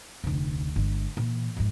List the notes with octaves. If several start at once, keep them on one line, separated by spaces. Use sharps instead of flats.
F1 D2
G1 G#3
A#2 E3
F2 G#2